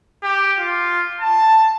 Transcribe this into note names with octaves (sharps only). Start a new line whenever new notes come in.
G4
F4
A5